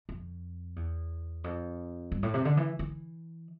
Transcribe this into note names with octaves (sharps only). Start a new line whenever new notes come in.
F2
E2
F2
G2
A2
C3
D3
E3
E3